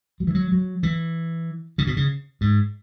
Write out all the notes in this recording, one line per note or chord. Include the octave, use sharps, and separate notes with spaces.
F#3
E3
F#3
F#3
E3
C#3
B2
C#3
G#2